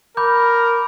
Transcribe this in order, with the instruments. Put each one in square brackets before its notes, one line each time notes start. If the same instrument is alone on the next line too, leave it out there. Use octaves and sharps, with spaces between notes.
[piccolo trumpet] A#4 [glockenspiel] B5 D6 G6